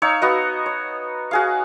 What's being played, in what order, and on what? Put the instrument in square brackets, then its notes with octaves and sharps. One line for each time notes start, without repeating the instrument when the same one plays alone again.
[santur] D#4 C#5 F5 E6
B3 F#4 D#5
C#5
F#4 G#4 F5